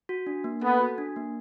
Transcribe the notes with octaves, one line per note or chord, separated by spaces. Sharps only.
F#4
D4
A#3
B3 A4
F#4
D4
A#3